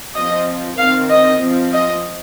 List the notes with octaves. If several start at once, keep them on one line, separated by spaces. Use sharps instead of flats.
F3 C4 D#5
D#3 C4 F5
D#5
F3 C4
D#5